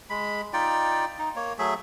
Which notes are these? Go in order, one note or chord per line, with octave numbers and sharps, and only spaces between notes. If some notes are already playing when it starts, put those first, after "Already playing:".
G#3 B5
D#4 F4 D5 G5
D#4
A#3 C#5
F#3 A3 G#4 E5